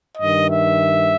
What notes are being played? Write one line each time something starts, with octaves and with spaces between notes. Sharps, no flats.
G2 D#3 D#5
E5